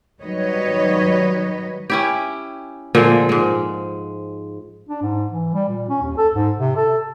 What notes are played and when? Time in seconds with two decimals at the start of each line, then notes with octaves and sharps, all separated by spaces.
0.22 D#3 F#3 G3 B4 C#5 D#5
1.90 C#4 E4 G4
2.95 A#2 D3 F3 G#3
3.29 G#2 G#3
4.89 D4
5.02 G#2
5.31 E3
5.54 G3
5.68 A#2
5.89 C#4
6.02 D#2
6.18 A4
6.34 G#2
6.58 C3
6.76 A4